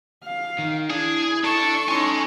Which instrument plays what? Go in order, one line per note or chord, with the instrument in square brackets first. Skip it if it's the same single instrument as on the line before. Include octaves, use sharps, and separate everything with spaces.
[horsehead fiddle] F5
[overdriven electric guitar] D#3
[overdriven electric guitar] D4 [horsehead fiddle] E4 [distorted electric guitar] G#4
[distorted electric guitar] D4 A5 [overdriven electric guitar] A4 [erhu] C#6
[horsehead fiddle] C#4 D#4 [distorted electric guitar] G#5 C6